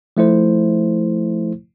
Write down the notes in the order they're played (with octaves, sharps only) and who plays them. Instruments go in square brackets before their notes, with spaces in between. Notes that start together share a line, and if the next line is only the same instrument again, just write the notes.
[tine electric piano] F3 A3 E4 C5